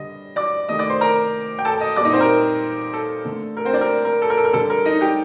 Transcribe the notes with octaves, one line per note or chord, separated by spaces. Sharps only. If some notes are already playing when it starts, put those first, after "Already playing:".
Already playing: D3 G3 D#5
D5 D6
C3 D#3 A3 D#5 D#6
D5 D6
C5 C6
A#4 A#5
G5
A4 A5
D#5 D#6
A#2 G3 D#4 D5 D#5 D6
C4 C5
A#4
A4
D3 A3
A#4
C4 C5
D4 D5
A#4
A#4
A4
A#4
A4
A#4
D3 G3 A4
A#4
D#4 D#5
G4 G5